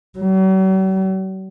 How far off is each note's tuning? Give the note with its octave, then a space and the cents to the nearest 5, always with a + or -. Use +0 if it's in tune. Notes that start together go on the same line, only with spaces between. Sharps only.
F#3 +45